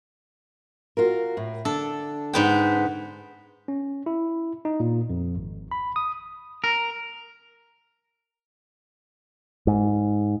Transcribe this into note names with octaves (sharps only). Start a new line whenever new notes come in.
F4 F#4 A#4
A2
D3 D4 A4
G#2 B3 G5
C#4
E4
D#4
A#2
F2
G#1
B5
D#6
A#4
G#2